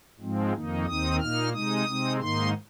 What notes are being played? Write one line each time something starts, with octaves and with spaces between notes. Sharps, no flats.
G#2 F3 G#3 C4
F2 D#3 A#3 D#4
D#2 D#3 C4 D#4 D#6
A#2 A#3 D#4 F6
C3 G#3 D#4 D#6
C3 G#3 C4 D#4
G#2 D#3 A#3 D#4 C6